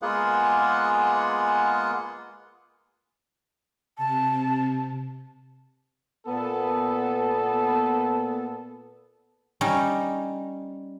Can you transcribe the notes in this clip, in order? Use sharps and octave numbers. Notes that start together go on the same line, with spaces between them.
G#3 A#3 B3 F4 G#4 F#5
C3 A5
A#2 B3 A4
G3 C#4 D#4